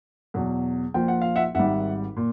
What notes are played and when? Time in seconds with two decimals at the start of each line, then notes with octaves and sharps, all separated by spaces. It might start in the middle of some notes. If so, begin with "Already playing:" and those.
0.34 E2 B2 F#3
0.94 A#1 A#2 F3 G5
1.08 F#5
1.22 F5
1.36 E5 F#5
1.55 G#1 G#2 D#3 G3 E5 F#5
2.17 A#2